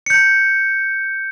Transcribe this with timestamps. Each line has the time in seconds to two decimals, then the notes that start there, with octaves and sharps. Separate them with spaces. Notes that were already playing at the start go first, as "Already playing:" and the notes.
0.06 G6 C#7